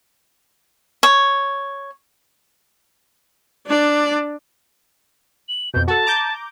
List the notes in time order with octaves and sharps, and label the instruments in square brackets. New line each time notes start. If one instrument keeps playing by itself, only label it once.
[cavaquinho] C#5
[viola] D4 D5
[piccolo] F#7
[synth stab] F2 B2 [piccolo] G6
[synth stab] F#4 A4 [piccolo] A5
[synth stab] A#5 D6 G6